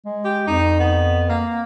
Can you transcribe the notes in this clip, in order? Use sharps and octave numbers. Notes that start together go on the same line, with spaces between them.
G#3
G4
F2 D#4
B3
A#3